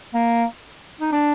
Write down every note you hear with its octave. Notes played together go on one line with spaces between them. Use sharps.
A#3
D#4
D4